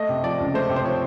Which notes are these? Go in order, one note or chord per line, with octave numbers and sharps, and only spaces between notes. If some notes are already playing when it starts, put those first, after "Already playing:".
Already playing: A3 D#5
C3
F3 D5
C#2
A3 C5
C3
C5
F3 C#5